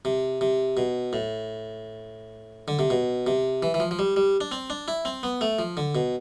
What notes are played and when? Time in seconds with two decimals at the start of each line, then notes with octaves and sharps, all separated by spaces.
0.05 C3
0.41 C3
0.77 B2
1.13 A2
2.68 D3
2.79 C3
2.90 B2
3.27 C3
3.63 E3
3.74 E3
3.80 F3
3.91 F3
3.99 G3
4.16 G3
4.41 D4
4.52 C4
4.70 D4
4.88 E4
5.05 C4
5.23 B3
5.41 A3
5.59 F3
5.77 D3
5.95 B2